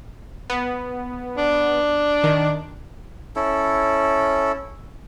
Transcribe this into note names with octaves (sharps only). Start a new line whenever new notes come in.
B3
D4
D#3
C#4 E4 A4